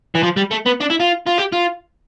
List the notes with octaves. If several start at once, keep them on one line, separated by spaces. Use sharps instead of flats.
E3
F3
G3
A3
B3
D4
E4
F4
F4
G4
F4